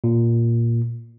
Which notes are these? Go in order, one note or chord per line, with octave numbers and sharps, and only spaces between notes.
A#2